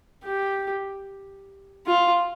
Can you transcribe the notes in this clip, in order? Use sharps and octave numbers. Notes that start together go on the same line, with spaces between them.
G4
F4